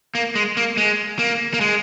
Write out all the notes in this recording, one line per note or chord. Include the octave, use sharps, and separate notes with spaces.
A#3
G#3
A#3
G#3
A#3
A#3
G#3